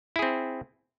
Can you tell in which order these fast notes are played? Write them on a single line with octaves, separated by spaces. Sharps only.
E4 G#4 C4